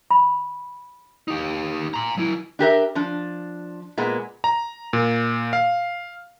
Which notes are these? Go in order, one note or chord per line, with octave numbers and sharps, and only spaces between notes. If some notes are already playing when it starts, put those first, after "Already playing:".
B5
D#4 G4
A#5 C6
F#3 E4
D4 G4 A#4 E5
F3 D4
A#2 G#3 B3
A#5
A#2
F5